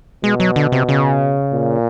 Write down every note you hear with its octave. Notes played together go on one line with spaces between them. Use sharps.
B2 G#3
F#3
D3
C3
C#3
A#2